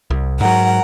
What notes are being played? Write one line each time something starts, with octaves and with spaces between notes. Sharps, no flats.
C2
G#2 F#3 A#4 F#5